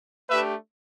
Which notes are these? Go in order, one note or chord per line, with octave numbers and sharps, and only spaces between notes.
A3 D4 G4 B4 E5